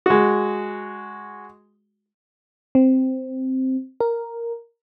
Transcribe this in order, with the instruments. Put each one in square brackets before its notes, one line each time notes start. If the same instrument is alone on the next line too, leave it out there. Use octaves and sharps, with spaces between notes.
[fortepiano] G#3 F#4
[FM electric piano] C4
A#4